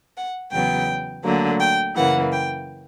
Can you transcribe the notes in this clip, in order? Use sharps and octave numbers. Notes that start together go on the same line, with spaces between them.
F#5
E2 C#3 F#3 B3 G5
D2 D3 F#3 A#3
G5
F#2 C#3 E3 A#3 F#5
G5